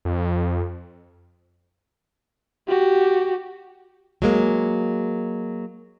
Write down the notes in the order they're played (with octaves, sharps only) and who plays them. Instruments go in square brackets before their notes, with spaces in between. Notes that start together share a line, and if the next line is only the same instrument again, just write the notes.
[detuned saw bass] F2
[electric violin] F#4 G4
[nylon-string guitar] F#3 G#3 A#3